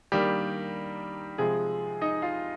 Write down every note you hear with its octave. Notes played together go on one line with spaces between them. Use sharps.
D#3 G3 A#3 D4 G4
C3 F3 G#3 G#4
D#4 D#5
F4 F5